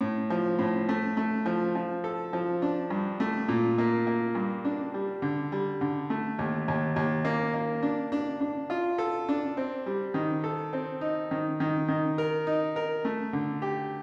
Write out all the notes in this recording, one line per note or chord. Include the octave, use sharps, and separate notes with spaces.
A2
F3
A2
A3
A3
F3
F3
A4
F3
D4
G2
A3
A#2
A#3
A#3
G2
D4
G3
D3
G3
D3
A3
D#2
D#2
D#2
A#3
A#3
D4
D4
D4
F4
A4
D4
C4
G3
D#3
A4
C4
D#4
D#3
D#3
D#3
A#4
D#4
A#4
A3
D3
G4